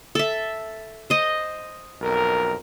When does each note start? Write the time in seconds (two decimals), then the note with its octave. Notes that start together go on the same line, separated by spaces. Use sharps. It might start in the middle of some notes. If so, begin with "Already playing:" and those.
0.15 A4 E5
1.10 C5 D#5
2.02 B1 F2 A#4